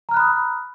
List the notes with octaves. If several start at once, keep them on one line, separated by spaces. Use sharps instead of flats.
A#5 B5 D#6 F6 F#6